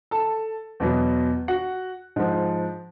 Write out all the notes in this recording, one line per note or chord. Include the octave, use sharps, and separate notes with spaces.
A4 A5
E2 B2 F#3
F#4 F#5
G#2 F3